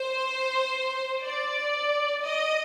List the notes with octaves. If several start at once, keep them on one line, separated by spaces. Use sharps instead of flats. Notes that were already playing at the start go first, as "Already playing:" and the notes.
Already playing: C5
D5
D#5